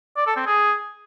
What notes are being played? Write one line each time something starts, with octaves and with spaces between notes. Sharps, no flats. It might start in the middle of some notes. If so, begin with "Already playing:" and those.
D5
A4
C4
G#4